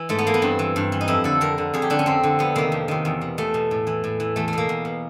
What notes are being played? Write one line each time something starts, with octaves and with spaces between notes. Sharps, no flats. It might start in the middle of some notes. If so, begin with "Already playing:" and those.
Already playing: E3
G#2 A3
B3
E3 A#3
B3
G2 C4
E3
G2
E3
D#4
F2 E4
D3 A4
F2 A#4
D3
F2 G#4
G4
D3 D4
C#4
F2 C4
D3
F2 B3
C3 D#3 A#3
F2
C3 D#3
E2
B2
E2 A3
B2
A2
E3
A2
E3
E2 A3
A3
B2 A#3
E2
B2